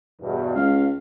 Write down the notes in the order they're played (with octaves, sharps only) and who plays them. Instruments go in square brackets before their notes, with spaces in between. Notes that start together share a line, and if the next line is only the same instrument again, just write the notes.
[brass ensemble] E2 G2 B2
[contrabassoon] C#2 [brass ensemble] F5